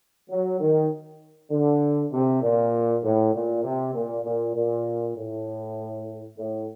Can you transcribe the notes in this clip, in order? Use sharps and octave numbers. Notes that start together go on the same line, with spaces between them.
F#3
D#3
D3
C3
A#2
A2
A#2
C3
A#2
A#2
A#2
A2
A2